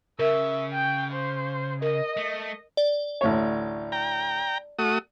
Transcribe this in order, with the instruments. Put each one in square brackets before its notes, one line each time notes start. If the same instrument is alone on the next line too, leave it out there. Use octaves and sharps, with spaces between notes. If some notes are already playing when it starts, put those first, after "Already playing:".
[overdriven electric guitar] C#3 [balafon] A#4 [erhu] E5
[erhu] G5
C5
[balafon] A#4 [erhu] D#5
[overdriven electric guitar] A3
[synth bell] D5
[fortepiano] A1 D2 C#5
[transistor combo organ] G5 A#5
A3 F#4 D#6